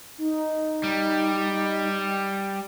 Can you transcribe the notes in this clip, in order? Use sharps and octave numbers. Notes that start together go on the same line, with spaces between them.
D#4
G3